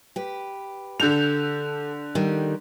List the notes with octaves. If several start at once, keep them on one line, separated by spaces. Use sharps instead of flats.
G4 B4
D3 A4 G6 F7
D#3 G3